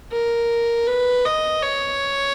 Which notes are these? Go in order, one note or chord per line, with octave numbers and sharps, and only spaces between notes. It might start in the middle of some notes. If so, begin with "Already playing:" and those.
A#4
B4
D#5
C#5